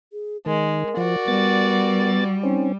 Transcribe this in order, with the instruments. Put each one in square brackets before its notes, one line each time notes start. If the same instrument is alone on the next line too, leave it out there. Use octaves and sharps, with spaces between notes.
[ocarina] G#4
[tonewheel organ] D#3 [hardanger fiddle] G#3 [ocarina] A#4
[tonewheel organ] F3 [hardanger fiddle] F#4 D5
[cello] G3 [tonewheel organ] B3 A6
[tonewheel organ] C4 C#4 [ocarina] D#4